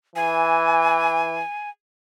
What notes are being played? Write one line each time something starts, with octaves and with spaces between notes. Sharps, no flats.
E3 G#5